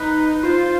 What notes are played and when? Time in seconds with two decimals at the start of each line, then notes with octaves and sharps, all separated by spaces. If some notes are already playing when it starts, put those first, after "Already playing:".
Already playing: D#4 B4
0.43 F4 C5